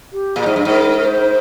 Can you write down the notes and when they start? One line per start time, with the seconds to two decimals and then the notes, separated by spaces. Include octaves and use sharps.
0.13 G4
0.36 A#2 G#4
0.46 G#2
0.56 G2
0.65 G#2 A#4
1.00 A#4
1.05 C5